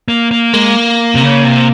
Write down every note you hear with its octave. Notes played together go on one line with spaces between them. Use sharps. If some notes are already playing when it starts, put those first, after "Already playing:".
A#3
A#3
G#3 A#3
C3
C#3
C3